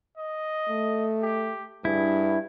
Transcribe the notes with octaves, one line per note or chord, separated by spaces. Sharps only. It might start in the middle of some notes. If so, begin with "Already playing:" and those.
D#5
A3
G4
G2 E4 G#4